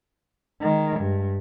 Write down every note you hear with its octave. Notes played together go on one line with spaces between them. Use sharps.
D#3 G#3
G2